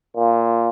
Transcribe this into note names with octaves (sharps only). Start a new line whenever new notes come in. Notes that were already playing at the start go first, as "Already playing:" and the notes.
A#2